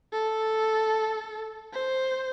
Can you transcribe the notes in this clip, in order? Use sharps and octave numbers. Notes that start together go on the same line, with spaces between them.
A4
C5